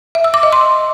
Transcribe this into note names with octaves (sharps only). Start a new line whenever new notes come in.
E5
E6
D6
D#5
C6